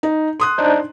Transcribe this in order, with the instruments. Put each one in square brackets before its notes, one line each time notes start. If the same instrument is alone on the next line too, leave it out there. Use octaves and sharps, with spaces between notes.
[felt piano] D#4
C6 D#6 F#6
[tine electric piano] D4 D#4 C5